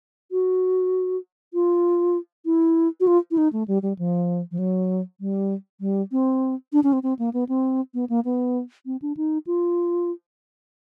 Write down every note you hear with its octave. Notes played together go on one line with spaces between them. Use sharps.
F#4
F4
E4
F#4
F4
E4
D#4
A3
G3
G3
F3
F3
F#3
G3
G3
C4
D4
C#4
C4
C4
A#3
B3
C4
B3
A#3
B3
C4
D4
D#4
F4